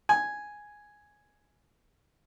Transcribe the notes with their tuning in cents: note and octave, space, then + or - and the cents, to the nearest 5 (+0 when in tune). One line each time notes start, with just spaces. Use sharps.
G#5 +0